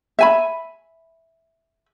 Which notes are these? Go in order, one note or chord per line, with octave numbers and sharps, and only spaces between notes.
E5 G#5 B5